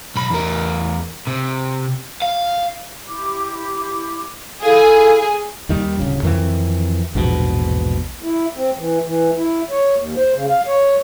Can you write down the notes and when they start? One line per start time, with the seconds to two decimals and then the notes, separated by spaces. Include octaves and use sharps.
0.16 B1 B5
0.30 E2 A#4
1.27 C3
2.22 F5
3.08 E4 G4 D6
4.63 E4 G#4 A4 F5
5.69 D#2 D#3 G3
6.00 D1 C2 C#3
6.23 F2 D#3 E3 C4
7.15 A#1 E2 G#2 B2
8.22 E4
8.56 C4
8.78 E3
9.05 E3
9.36 E4
9.70 C#5
9.96 D#2
10.17 C5
10.33 C#3
10.49 F5
10.67 C#5